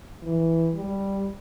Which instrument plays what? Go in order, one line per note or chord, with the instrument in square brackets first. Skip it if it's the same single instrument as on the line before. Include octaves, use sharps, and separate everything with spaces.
[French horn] E3
G3